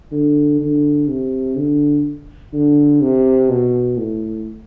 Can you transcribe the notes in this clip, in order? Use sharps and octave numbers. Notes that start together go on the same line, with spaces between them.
D3
D3
C3
D3
D3
C3
B2
A2